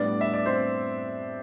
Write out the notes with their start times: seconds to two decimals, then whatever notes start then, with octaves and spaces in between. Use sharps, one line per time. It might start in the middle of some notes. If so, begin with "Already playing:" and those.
Already playing: A2 G3 B3 D4 D5
0.21 E5
0.34 D5
0.46 C4 C5